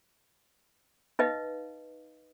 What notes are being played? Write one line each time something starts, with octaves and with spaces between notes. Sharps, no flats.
D#4 B4 D#5 F5